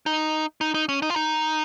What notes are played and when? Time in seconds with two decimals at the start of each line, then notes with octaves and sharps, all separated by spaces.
0.06 D#4
0.61 D#4
0.74 D#4
0.89 C#4
1.02 D#4
1.10 F4
1.16 D#4